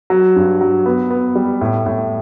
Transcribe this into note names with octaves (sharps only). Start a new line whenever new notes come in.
F#3
G2
F#3
B3
B3
G3
A2
A2